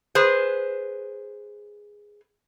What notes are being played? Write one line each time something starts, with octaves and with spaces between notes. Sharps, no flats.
G#4 B4 C5